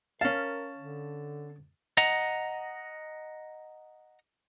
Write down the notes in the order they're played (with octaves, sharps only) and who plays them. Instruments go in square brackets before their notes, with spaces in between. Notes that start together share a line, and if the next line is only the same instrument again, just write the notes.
[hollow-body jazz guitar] C#4 F5 [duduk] A#4 [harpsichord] A5
[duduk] D3
[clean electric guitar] D#5 F#5 A#5